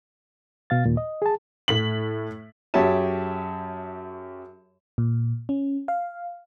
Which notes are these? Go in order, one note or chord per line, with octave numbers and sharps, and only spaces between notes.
B2 F5 A6
D#2 A#2
D#5
G#4 A5
A2 B6 F#7
F#2 G4 G#4 C#5 E5 A5
A#2
C#4
F5